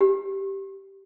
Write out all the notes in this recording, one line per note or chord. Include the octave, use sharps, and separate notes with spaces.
G4